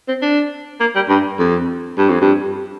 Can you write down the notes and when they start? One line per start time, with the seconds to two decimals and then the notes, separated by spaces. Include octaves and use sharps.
0.08 C4
0.22 D4
0.80 A#3
0.95 G3
1.09 G2
1.39 F2
1.98 G2
2.10 F2
2.21 G2